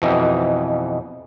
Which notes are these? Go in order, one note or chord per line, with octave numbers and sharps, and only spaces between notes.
F2 B2 E3 D#4 G5